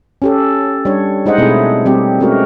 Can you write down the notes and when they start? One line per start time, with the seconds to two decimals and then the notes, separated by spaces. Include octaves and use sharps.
0.22 C#4 G4 A4
0.85 G3 D4 C#5
1.26 G#3 D#4 C5 D#5 F#5
1.38 B2 A3 C4 E4 G#4
1.86 G3 C4 G4
2.20 G#3 A3 C#4 F#4 A#4